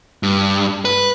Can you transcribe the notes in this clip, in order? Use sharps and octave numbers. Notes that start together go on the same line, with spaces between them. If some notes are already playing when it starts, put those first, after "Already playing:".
G2
B4